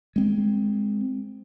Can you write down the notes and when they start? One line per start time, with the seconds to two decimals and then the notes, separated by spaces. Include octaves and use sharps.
0.16 G#3 C4